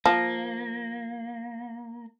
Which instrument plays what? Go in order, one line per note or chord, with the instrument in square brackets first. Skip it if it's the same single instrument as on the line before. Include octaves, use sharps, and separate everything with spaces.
[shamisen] F3 [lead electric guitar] A#3